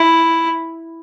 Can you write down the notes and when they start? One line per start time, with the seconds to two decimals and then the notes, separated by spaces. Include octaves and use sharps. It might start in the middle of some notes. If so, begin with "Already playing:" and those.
Already playing: E4